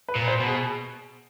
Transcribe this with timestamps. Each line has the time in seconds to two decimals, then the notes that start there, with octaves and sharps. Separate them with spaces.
0.08 B4
0.15 A#2
0.28 C5
0.40 B2
0.47 G#4